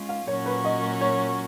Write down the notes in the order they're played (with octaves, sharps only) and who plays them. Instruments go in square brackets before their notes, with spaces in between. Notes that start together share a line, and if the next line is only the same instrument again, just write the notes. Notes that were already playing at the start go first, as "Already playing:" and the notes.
Already playing: [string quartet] G#3 C#4 F4
[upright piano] F5
[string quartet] A#2 F#3 C#4 F#4 A#4 [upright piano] C#5
[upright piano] B4
D#5
C#5